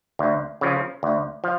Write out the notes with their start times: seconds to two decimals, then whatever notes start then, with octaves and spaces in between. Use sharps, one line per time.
0.19 D2
0.61 C#3 F3
1.03 D2
1.44 F3